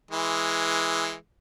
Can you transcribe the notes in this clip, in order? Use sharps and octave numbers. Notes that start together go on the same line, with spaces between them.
E3 G#3